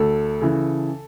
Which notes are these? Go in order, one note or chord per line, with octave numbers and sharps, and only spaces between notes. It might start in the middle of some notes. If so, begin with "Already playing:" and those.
Already playing: D2 A4
C#3 E3